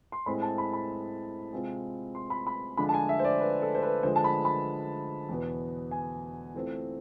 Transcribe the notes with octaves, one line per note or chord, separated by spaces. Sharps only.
C6
A2 G#3 C4 B5
A5
B5
B5
C3 G#3 C4 F4
C6
B5
B5
D3 F3 G#3 D4 F4 B5
A5
G#5
E5
C5
D5
B4
A4
C5
B4
D3 F3 G#3 C5
A5
B5
B5
E2 B2 B3
G#5
E3 A3 C4 F4